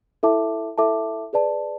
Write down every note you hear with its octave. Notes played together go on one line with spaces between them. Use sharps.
E4 A4 E5 A5 D6
E4 A4 E5 A5 D6
G#4 B4 D5 A5